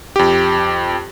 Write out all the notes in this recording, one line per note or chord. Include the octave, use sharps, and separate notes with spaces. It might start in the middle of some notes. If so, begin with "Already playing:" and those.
F2 G4